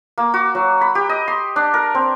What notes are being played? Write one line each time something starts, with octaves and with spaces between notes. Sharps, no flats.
A#3
F#4
F#3
B5
G4
D#5
C6
D4
A#4
C4